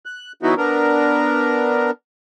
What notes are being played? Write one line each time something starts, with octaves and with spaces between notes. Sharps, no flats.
F#6
E3 F#3 B3 D#4 E4 F#4
B3 D4 A#4